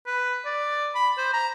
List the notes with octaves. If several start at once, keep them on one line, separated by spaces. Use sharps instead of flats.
B4
D5
B5
C5
A#5